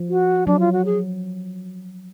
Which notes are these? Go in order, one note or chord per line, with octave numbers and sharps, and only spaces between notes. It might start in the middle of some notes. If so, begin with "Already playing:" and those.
Already playing: F3
F#4
F#3 D4
F4
F#4
G#4